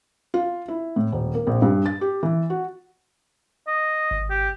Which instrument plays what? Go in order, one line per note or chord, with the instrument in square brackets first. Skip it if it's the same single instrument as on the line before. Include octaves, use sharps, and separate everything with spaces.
[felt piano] F4
E4
A2
D#1
A#3
A#1
G2
A6
G4
E3
F#4
[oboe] D#5
[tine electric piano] G#1
[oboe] G4